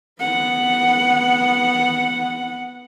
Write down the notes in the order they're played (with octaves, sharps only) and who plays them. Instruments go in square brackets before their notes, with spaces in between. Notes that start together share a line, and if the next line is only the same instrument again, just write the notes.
[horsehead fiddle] B3 F#5